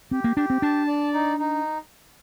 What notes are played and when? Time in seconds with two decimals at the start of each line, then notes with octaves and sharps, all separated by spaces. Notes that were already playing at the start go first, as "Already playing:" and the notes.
0.11 C4 G4
0.24 A#3
0.37 D4 G4
0.50 C4
0.62 D4 A5
0.88 D5
1.14 D#4
1.39 D#4